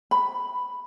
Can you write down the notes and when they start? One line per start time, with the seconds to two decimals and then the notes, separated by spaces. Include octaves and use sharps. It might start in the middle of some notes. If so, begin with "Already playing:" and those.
0.11 B5